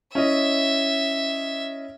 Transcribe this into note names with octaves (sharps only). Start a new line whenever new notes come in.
C#4 E4 D#5 E5